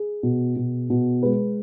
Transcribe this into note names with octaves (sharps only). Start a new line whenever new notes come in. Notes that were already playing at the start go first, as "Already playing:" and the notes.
Already playing: G#4
B2
B2
B2
G#3 B4